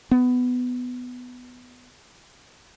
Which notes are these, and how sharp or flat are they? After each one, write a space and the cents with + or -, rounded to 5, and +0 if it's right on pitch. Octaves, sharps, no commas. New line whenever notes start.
B3 +10